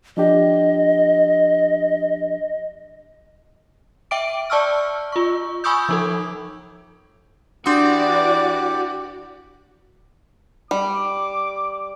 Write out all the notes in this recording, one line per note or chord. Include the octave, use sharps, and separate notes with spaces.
F3 D4 G4 D#5
E5 G5 D6 D7
D5 A5 C#6 E6 F6
F4 C#6
G#5 B5 C#6 D#6 E6 G6
F3 D#4 A4
E3 D4 F#4 G4 D5 C6 D#6
G3 D6